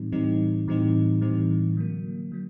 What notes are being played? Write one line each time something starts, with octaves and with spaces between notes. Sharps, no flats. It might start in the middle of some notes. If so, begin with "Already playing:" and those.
Already playing: A2 E3 G3 C4 D#4
A2 E3 G3 C4 D#4
A2 E3 G3 C4 D#4
A2 E3 G3 C4 D#4
D3 F#3 A#3
D3 F#3